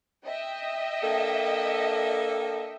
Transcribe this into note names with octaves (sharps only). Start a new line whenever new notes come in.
D#5 E5 G5
A#3 D4 A4